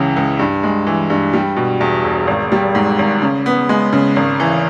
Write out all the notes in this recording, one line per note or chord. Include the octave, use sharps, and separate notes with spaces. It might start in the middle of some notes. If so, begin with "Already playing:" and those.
Already playing: C#2 C#3 E3
C#2
G2
G#3
E3
G2
G3
B2
E2
E1
G#1
G3
G#2
G#1
C#3
B3
G#3
C#3
G#1
E3